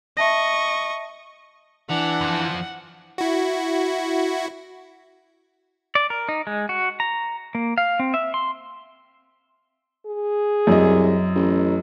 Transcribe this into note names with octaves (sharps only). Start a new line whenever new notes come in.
D#5 E5 A5 C#6 A#6
E3 D4 F#5
F2 F3
E4 F#4
D5
A#4
D#4
G#3
F#4
A#5
A#3
F5
C4
E5
C6
G#4
C2 F#2 D#5
A1